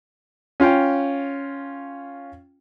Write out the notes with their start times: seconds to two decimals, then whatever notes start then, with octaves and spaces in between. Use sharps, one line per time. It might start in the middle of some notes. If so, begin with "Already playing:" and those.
0.60 C#4 F4 F5 G5